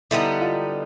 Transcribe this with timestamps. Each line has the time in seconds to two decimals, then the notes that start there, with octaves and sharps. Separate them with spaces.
0.11 D3 G3 B3 D#4 E4
0.41 F4